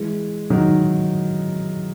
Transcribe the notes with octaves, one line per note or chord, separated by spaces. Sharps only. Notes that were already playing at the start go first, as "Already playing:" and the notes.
Already playing: E3 G#3
D#3 F#3